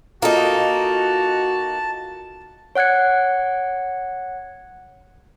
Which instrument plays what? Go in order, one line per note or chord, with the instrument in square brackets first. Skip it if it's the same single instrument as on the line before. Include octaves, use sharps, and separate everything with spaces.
[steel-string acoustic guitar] A#3 D#4 [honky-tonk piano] F4 A4 D#5 [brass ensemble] F#4 [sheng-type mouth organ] A5
[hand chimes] C#5 F#5 F#6 G#6 C#7